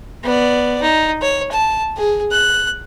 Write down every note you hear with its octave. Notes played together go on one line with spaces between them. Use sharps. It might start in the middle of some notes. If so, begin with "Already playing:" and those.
B3 D5
D#4
C#5
A5
G#4
F#6